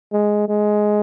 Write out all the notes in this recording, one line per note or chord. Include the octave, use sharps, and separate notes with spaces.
G#3
G#3